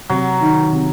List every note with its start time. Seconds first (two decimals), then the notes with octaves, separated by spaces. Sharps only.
0.10 C3 F#3
0.41 D#3
0.72 C3